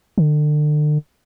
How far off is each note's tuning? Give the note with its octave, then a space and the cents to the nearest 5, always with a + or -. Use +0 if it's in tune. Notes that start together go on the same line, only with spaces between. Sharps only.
D3 +35